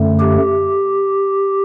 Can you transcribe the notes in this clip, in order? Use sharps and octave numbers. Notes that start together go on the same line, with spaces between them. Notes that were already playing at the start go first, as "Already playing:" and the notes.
Already playing: F#2 D3 A3
G4